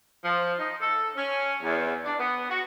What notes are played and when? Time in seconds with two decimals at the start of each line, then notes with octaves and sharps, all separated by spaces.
0.24 F3
0.59 D#4
0.81 A4
1.16 C#4
1.63 E2
2.05 D4
2.19 B3
2.50 F#4